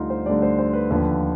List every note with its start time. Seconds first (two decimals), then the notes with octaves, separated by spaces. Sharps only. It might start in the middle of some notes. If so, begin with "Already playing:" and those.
Already playing: D2 D3 G3 D#4 F4
0.10 C5
0.26 D2 D3 G3 D5
0.42 C5
0.59 C5
0.73 B4
0.90 D#2 D3 F3 B4